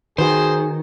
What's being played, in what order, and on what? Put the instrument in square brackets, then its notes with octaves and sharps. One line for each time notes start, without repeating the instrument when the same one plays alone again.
[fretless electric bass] D#3 [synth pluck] F#4 B4 [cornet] G#4 [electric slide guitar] C5